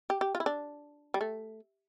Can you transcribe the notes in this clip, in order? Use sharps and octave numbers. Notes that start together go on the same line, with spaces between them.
G4
G4
F4
E4
D4
G3
A3